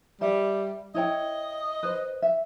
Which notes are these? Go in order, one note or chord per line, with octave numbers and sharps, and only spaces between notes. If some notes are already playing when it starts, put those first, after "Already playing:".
G3 G4 E5
E4 C#5 D#5 G5
B4 C5
E5